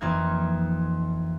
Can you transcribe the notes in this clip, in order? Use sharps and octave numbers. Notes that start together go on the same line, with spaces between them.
F2 E3 A#3 D#4 G#6